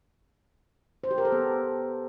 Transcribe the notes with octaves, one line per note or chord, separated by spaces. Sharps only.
C5
G4
A#4
A4
B3